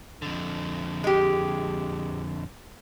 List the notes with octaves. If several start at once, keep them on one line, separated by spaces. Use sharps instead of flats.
F2 D3
G#3 G4